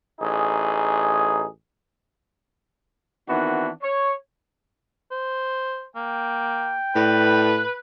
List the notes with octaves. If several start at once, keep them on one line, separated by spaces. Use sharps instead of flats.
A1 D#4 G#4
D#3 E3 B3 C4 D4 F#4
C#5
C5
A#3 G5
A2 B4 D5